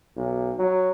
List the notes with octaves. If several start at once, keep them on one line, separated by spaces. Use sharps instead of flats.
B1
F#3